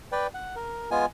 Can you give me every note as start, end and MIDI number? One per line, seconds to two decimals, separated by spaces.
0.12 0.27 71
0.12 0.27 74
0.12 0.27 79
0.34 0.56 78
0.56 0.90 70
0.91 1.06 56
0.91 1.06 59
0.91 1.06 65
0.91 1.06 80